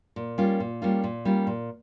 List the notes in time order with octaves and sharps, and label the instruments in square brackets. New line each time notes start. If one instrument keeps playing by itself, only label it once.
[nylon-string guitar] A#2
G3 A#3 C#4 F4
A#2
G3 A#3 C#4 F4
A#2
G3 A#3 C#4 F4
A#2